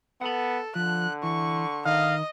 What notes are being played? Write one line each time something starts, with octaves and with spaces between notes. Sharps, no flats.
B3 A4 F#5 B5
D3 F3 F#6
E3 C#6
D#3 D#5 F5